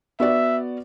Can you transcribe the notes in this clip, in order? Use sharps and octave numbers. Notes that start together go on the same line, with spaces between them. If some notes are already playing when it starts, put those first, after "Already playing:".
B3 F#4 D5 E5